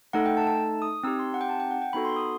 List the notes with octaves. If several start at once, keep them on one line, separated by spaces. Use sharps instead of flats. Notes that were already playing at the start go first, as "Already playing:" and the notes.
A3 D#4 A4 F#5
G5
A5
A5
D#6
C4 D#4 G4 E6
C6
F#5
G5
A5
G5
F#5
G5
B3 D#4 F#4 A4 B5
C6
D#6